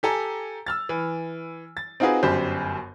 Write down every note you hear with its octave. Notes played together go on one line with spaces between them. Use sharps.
G4 A4 G#5 A#5
E6 F6 A6
E3
A6
C4 D#4 F4 F#4 G#4 B4
G1 F#2 G4 C5 B5